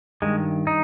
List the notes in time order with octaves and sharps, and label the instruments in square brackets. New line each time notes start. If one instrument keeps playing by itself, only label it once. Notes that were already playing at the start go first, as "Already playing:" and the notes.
[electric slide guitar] G2 D#3 G#3
D#4